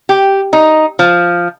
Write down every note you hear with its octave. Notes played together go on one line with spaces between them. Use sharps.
G4
D#4
F3